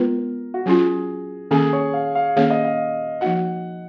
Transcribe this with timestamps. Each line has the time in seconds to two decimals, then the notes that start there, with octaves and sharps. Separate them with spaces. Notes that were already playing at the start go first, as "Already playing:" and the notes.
Already playing: G#3 B3 F4 A#4 B4
0.54 F#4
0.66 F#3 C#4 F4 G#4
1.51 D#3 A#3 C#4 G#4
1.73 C#5
1.94 F5
2.15 F5
2.36 D#3 A#3 C#4 G#4 C#5 F5
2.50 D#5
2.64 F5
3.21 F3 A#3 D#4 F#4 F#5